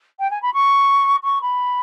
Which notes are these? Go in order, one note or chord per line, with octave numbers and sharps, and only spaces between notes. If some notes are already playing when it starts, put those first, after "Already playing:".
G5
G#5
B5
C#6
C#6
B5